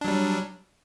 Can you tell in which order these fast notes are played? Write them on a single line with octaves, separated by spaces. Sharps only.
D4 F#3 G3